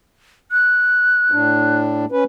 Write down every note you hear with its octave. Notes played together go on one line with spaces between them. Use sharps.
F#6
A2 D4
C#4 B4